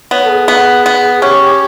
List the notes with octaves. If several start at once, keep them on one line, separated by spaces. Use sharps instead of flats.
B3 C#5
A4
G#4
B3
B3
C#4 G4